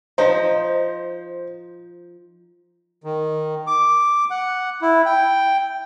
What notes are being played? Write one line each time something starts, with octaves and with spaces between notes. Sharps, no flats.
F3 D#4 C5
D#3
D6
F#5
E4
G5